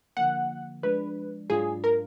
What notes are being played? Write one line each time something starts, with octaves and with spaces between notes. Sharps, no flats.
D3 F3 A#3 F#5
F3 G#3 D4 B4
G#2 F#3 D4 F4 G#4
A#4